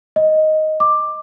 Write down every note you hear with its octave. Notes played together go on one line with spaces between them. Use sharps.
D#5
D6